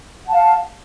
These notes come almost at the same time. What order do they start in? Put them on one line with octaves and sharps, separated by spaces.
F#5 A5 F5